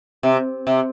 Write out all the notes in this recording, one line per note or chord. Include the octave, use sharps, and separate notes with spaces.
C3
C3